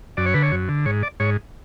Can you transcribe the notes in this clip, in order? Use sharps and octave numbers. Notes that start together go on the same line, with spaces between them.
F#2 D5
C#5
D3 B4
C#5
F#2
D3
G#2 C#5
D5
G#2 C#5